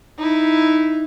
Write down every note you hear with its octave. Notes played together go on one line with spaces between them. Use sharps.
D#4 E4